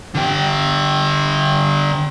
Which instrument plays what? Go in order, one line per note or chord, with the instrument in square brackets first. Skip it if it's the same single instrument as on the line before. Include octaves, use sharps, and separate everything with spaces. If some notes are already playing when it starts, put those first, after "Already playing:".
[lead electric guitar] D3 G4